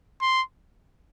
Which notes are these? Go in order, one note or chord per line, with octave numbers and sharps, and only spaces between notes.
C6